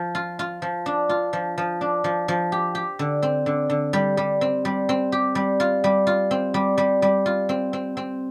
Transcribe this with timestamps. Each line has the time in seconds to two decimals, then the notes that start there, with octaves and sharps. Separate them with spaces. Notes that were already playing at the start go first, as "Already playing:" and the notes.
Already playing: F3
0.15 F4
0.39 F4
0.62 F3
0.86 D4
1.09 F4
1.33 F3
1.58 F3
1.81 D4
2.04 F3
2.28 F3
2.52 G4
2.75 G4
2.99 D3
3.23 C4
3.46 D3
3.70 D3
3.93 G3
4.17 G3
4.41 C4
4.65 G3
4.89 C4
5.12 G4
5.35 G3
5.60 F4
5.84 G3
6.07 F4
6.31 C4
6.54 G3
6.78 G3
7.02 G3
7.26 F4
7.49 C4
7.73 C4
7.97 C4